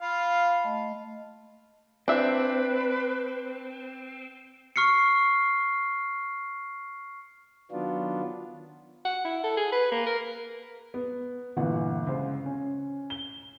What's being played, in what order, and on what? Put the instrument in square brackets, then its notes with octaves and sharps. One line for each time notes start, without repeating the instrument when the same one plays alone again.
[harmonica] F4 F5 [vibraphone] B5
[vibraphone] A3 D#5 A5
[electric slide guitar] C4 [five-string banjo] D4 E5 [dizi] B4
[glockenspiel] C#6 F6 C7 C#7
[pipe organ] D#3 F#3 B3 D4 F4
[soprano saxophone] F#5
E4
A4
G#4
B4
A#3
A#4
[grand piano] B3
G1 A#2 E3 F#5
C#2 C5
C#4
G7